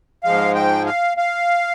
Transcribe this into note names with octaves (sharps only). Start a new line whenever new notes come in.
G#2 F3 G#3 F5
G5
F5
F5